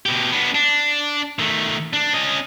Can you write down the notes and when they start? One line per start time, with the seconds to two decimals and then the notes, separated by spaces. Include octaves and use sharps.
0.06 B2 G4
0.32 B3 D4
0.55 D4
1.39 D#3 A3
1.93 D4
2.14 C#4 D#5